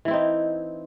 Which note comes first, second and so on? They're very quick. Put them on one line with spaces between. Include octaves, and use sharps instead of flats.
E3 E4 C4 D#4